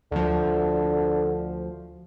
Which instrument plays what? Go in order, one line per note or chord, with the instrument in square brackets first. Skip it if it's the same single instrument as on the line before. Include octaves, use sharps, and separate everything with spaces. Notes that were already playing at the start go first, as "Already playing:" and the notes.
[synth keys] D2 F3 [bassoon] D3